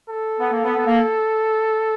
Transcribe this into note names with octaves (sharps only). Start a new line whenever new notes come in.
A4
B3
A#3
B3
B3
A#3